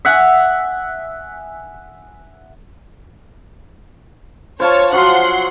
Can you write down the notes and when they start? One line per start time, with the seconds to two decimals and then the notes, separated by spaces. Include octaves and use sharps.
0.05 E5 F#5 G#5
4.60 F4 C5 C#5 A5
4.92 F3 F#3 F#5 C6